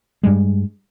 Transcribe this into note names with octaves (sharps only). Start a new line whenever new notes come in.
G2 G3 G#3